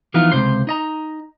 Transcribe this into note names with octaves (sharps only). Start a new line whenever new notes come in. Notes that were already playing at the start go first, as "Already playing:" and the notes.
E3 F3 B3 D#4 F4
C#2 F#2 C3 C5 C6
D#4 D#5 A#5